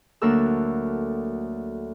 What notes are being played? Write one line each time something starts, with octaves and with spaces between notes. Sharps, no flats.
D2 F#3 A#3 A4 A#4 E6